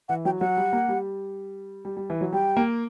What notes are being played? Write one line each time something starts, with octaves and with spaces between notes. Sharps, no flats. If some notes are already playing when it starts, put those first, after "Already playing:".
E3 F#5
F#3 G5
F#3 F#5
G3
A#3
G3
G3
G3
E3
F#3
G3 G5
A#3